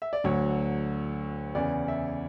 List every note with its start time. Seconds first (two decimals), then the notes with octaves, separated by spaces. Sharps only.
0.02 E5
0.13 D5
0.24 D2 D3 F#3 C#5
1.55 E2 C#3 E3 D5
1.88 E5